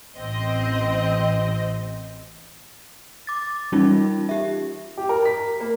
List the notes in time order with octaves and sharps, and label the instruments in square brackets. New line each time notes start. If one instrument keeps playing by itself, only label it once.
[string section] A1 C4 D#5
[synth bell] D6 A6
E3 G3 C#4 D#4 F4
G4 E5
[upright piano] G4
A#4
B6
A#3